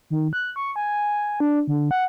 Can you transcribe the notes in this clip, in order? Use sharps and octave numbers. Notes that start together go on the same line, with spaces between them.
D#3
F#6
C#6
G#5
D4
D3
F#5